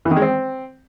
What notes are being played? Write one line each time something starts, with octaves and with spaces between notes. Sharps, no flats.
E3
D#3
G#3
C4